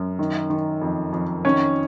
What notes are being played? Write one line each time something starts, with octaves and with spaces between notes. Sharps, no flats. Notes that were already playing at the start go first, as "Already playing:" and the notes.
Already playing: F#2
D#3
D#3
F2
F2
D#3 C#4